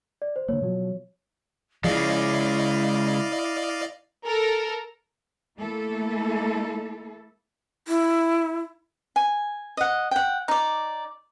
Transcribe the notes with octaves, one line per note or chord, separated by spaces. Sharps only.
D5
C5
D3 F3 A#3 C#5
B2 F3 F#3
C#3 F3 G#3 E4 D5 D#5 F5
A4 A#4
A3 A#3 E4 A4
E4
G#5
D#5 F#5
F#5 G5
D#4 D5